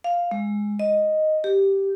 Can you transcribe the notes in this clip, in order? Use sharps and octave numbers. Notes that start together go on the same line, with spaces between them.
F5
G#3
D#5
G4